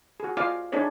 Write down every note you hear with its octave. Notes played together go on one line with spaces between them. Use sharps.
F#4 G#4
F4 D5 D#5 F5 G#5 D6
D4 D#4 G#4 C#5 D5